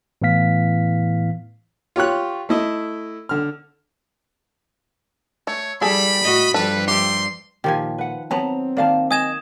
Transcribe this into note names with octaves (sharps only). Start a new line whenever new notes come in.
A2 E3 B3 F5 B6
F4 G4 C#5 F#6
A3 E4 D#5
D3 F6
A3 C#5
G3 E4 G#4 A4 B5
A2 F#4 D#5
G2 F3 G3 A4 B4
A3 G4 C6
A#2 D#3 F3 G4 G#5
B4 F#5
F#3 B3 C4 A5 A#5
D#3 A#3 D5 F5 A5
D#5 G#5 D#6 G#6 E7